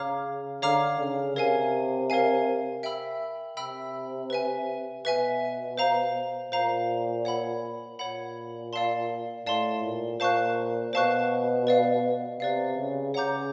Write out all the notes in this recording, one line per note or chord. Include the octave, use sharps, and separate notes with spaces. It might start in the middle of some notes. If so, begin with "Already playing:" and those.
Already playing: C#3 C#5 F5 A#5 D6 F6
D3 C#5 F5 A#5 D6 F6
C#3
C3 A#4 C#5 F5 G#5
A#4 C#5 F5 G#5
E5 G5 B5 E6
C3 E5 G5 B5 E6
B4 E5 G#5
B2 B4 E5 G#5
C5 F5 A#5
A#2 C5 F5 A#5
C#5 F#5 B5
A#2 C#5 F#5 B5
D5 F5 A5 C6
A2 D5 F5 A5 C6
A#2
A#2 C5 F5 A5 C#6 F#6
B2 C5 F5 A5 C#6 F#6
B4 D5 F5
C3 B4 D5 F5
C#3
C#3 C#5 F#5 A#5 D6 G6